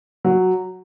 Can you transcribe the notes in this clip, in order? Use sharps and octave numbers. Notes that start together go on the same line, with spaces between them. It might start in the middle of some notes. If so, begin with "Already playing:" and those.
F#3